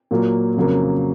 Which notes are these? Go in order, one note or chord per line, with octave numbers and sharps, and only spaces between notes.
A#2 F#3 A#3
F2 C#3 F#3 A#3